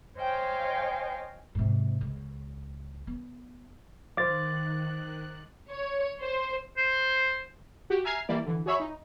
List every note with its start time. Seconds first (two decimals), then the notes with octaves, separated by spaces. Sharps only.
0.17 C5 C#5 D#5 F5 G5 G#5
1.55 G#2 C3
2.01 C#2
3.07 B3
4.17 D#3 C5 F5 D6 F#6 A6
5.70 C#5
6.22 C5
6.77 C5
7.90 F#4 G4
8.04 E5 G#5 A#5 F6 G#6 C7
8.29 E3 G3 A#3 E4 D5
8.46 D3 E3
8.66 F#4 G#4 C#5 E5 B5 C#6
8.80 D#4